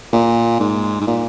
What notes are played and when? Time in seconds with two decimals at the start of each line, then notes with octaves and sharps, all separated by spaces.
0.13 A#2
0.60 G#2
1.01 G#2
1.07 A#2